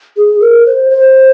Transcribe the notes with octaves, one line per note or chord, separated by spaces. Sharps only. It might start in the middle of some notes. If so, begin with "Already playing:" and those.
G#4
A#4
C5
C5